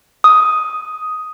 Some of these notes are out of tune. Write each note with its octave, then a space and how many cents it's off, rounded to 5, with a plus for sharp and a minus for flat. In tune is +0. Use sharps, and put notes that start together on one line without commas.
D#6 +5